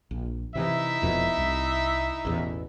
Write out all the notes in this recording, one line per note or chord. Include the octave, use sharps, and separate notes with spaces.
A#1
C3 D#3 E3 D#4 E4 E5
E1 F2 B2
C2
A1 E2 B2